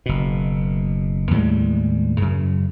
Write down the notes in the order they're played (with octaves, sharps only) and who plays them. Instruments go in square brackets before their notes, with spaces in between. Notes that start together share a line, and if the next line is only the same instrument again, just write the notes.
[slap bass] F#1 B2
D#2 A2 G3 G#3
F#2 C#3